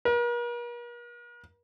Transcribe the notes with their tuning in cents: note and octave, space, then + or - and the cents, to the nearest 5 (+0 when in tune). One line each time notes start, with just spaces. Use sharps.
A#4 +45